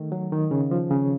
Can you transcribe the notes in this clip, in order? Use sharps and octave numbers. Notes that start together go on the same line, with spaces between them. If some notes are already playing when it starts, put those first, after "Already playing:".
Already playing: D#3 A3
F#3
D#3
C#3
F3
C#3